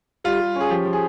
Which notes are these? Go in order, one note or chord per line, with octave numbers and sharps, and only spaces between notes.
G3 F4
G3
C#4
G#4
F3 G4
F3
G#4